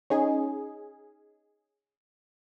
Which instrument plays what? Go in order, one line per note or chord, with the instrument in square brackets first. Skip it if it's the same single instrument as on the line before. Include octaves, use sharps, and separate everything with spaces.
[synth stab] C#4 D#4 G#4